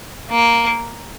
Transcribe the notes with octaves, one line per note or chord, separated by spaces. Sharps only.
A#3